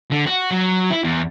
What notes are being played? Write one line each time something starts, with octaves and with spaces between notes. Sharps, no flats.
D3
F#4
F#3
E4
E2